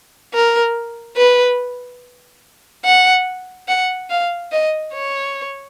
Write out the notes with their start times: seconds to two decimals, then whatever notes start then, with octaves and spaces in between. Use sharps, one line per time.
0.34 A#4
1.17 B4
2.84 F#5
3.68 F#5
4.10 F5
4.52 D#5
4.93 C#5